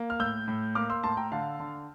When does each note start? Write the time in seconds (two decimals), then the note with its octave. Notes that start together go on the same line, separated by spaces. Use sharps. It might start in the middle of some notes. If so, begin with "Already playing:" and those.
Already playing: A#3
0.10 F6
0.20 A2 E6 G6
0.48 A2
0.75 A#3 D6 F6
0.90 C6 E6
1.04 A2 A5 C6
1.17 G5 A#5
1.32 D3 F5 A5
1.60 D3